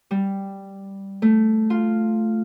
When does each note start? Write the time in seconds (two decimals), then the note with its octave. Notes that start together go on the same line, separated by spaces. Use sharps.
0.11 G3
1.22 A3
1.70 F4